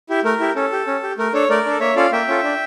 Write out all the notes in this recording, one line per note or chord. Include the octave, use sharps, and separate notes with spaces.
E4 G4
A3 A#4
E4 G4
C#4 A4
G4
C#4
G4
A3 A#4
D4 A4 C#5
A3 A#4 D5
D4 A4
A#3 C#5 E5
C#4 F4 A4 D5 F5
A#3 E5 G5
C#4 F4 A4
D4